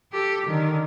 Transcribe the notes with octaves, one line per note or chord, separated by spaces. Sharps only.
G4 A4
D3 D#3